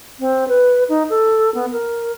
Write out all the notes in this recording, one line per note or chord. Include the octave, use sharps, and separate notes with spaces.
C4
B4
D#4
A4
B3
A#4